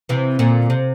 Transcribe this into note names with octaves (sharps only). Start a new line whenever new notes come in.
C3 E3
A#2 D3
C3